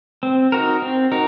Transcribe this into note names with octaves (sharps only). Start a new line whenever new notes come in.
C4
D#4 F#4 A#4
C4
D#4 F#4 A#4